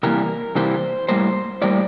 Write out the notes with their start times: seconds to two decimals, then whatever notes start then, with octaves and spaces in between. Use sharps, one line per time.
0.03 C3 E3 G3 A#3 A#4
0.55 C3 E3 G3 A#3 C5
1.08 A2 G3 A#3 C5
1.62 A2 G3 A#3 D5